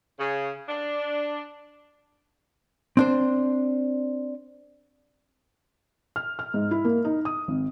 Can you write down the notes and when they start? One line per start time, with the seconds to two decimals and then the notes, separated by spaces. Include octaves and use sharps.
0.20 C#3
0.69 D4
2.97 C4 D4 C5
6.16 F6
6.39 F6
6.54 G#2
6.71 E4
6.85 A#3
7.05 D#4
7.25 D#6
7.48 G#1